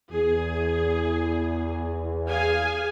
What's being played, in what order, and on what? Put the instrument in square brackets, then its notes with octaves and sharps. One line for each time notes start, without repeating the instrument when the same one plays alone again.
[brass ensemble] E2 [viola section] G#4
[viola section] G#4 F5 G#5